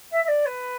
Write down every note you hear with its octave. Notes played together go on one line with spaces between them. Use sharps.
E5
E5
D5
B4